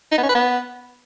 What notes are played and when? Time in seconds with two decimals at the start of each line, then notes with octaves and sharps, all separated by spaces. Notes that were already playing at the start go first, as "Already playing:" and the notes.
0.12 D#4
0.17 B3
0.23 C#4
0.29 B4
0.35 B3